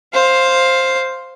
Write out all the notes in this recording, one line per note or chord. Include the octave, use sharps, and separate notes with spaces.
C5 F5